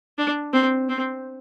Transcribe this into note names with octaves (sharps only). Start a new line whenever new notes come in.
D4
C4
C4